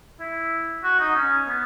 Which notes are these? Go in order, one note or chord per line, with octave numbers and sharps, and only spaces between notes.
E4
F#4
D#4
C#4
B3